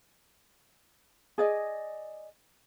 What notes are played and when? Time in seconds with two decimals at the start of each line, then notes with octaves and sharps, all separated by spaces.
1.38 G#4 D5 D#5